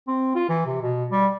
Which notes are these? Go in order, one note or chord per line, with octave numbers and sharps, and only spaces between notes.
C4
F4
E3
C3
B2
G3